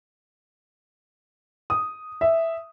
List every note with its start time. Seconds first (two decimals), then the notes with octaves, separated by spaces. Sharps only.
1.70 D#6
2.21 E5